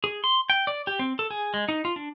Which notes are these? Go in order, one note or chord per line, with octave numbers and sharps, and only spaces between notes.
G#4
C6
G5
D5
G4
C4
A4
G#4
G#3
D#4
F4
D4